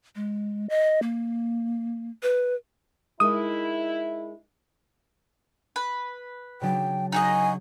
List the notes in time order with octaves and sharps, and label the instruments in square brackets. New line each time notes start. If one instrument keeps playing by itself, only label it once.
[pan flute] G#3
D#5
A#3
B4
[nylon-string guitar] G#3 D#4 A#4 [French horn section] E4 [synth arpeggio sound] D#6
[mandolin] B4
[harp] C#3 F#3 D4 [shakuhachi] G5
[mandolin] D#4 F#4 D#5 [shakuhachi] G#5